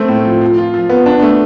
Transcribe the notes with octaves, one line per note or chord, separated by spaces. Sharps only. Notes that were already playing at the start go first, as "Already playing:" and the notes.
Already playing: A3 C4
A2
F3
F3
F4
F3
B3
D4
A3